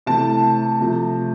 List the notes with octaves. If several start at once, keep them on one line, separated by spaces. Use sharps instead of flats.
C3 E3 A3 A5
C3 F3 A3